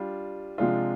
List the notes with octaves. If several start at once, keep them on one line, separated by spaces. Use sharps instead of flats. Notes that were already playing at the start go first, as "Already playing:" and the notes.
Already playing: G3 D4 F4
C3 F3 G#3 D4 F4